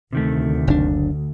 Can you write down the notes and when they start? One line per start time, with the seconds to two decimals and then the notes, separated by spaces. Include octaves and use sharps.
0.13 D2 C3 D#3 A3
0.67 F#1 D4